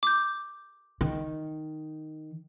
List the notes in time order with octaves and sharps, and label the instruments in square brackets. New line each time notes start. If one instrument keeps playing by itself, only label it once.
[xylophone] D6 G6
[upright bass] D#3